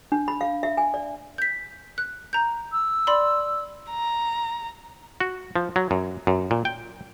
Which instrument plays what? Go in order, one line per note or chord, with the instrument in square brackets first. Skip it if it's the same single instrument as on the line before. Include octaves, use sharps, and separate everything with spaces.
[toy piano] D4
B5
F5
E5
G#5
D5
[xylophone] G6 B6
F#6
A#5 G6
[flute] E6
[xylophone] D5 B5 C6
[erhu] A#5
[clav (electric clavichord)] F#4
F3
F#3
F#2
F#2
A#2
G5